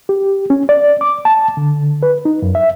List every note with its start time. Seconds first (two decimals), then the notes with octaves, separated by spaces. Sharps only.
0.09 G4
0.50 C#4
0.69 D5
1.01 D6
1.25 A5
1.57 D3
2.03 B4
2.25 D#4
2.42 F#2
2.55 E5